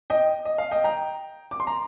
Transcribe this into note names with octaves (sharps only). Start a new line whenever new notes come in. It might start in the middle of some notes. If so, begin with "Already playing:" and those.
D#5 G5
D#5
F5
D#5 G5
G5 A#5
D6
C6
A#5